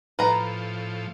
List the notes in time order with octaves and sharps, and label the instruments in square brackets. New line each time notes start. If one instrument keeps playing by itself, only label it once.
[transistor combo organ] A2 F3 [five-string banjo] B4 A#5